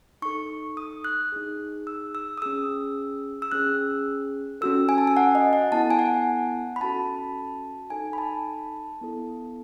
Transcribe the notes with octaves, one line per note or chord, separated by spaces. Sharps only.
D#4 A4 C#6
D#6
F#6
D#4 G#4
E6
E6
D#6
C#4 G#4 E6
E6
C#4 G#4 F#6
C#4 F#4 A4 E6
G#5
A5
G#5
F#5
D#5
F#5
B3 E4 A4 A5
G#5
F#5
B5
C#4 F#4 A4 A5
D#4 A4 G#5
B5
A5
B3 E4 A4